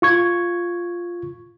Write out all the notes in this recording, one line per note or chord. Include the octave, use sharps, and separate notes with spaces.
F4 C#6 G#6